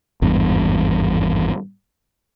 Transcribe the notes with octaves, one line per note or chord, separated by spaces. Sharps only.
G#1 E2 G2